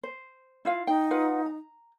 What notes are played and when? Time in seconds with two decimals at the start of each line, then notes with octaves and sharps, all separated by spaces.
0.03 C5
0.65 E4 F4 F5
0.87 D#4 G5
1.11 F4 B4 F#5
1.46 A#5